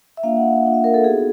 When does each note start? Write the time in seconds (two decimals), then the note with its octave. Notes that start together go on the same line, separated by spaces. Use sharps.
0.17 E5
0.23 A#3 D4 F4 F5
0.37 F#5
0.64 A#3 D4 F4
0.74 E5
0.84 A#4
0.94 A4
1.04 B3 D#4 F#4 G#4